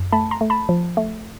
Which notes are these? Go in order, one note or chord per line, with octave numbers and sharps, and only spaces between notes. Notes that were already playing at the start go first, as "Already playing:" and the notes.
Already playing: F#2
A3 A5 B5
A#5 C6
A3
A5 B5
F3
A3